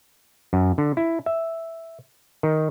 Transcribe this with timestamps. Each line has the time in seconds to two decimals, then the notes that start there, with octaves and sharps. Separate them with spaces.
0.53 F#2
0.78 D3
0.97 E4
1.26 E5
2.43 D#3